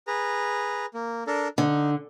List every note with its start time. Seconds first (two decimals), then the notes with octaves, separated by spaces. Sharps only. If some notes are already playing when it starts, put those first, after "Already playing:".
0.07 G#4 B4 A#5
0.94 A#3
1.27 D4 A4 A#4
1.58 D3 D#4